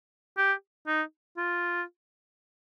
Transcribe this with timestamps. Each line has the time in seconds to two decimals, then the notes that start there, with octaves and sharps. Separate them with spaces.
0.38 G4
0.87 D#4
1.37 F4